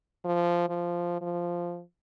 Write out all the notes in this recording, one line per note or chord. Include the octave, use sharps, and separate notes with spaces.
F3
F3
F3